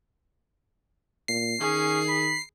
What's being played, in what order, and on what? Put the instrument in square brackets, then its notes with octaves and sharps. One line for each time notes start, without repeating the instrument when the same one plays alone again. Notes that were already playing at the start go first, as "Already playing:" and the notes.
[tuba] A#2 [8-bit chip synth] C7
[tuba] D#3 [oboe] C#4 [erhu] G#4
[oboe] B5